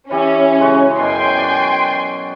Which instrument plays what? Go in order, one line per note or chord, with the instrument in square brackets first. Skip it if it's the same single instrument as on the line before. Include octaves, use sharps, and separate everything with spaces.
[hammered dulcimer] E3 G4 E5 [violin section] C#4
[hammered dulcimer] C#3 G#3 F#4
[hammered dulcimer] F#2 B2 [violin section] G5 G#5 C6
[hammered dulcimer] F#4 D5